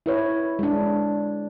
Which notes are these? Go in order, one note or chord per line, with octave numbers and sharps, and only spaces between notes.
E4 B4 C#5
G#3 D4